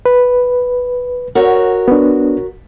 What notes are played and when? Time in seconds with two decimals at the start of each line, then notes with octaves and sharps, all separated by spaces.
0.06 B4
1.35 F#4 A#4 C#5
1.88 B3 D4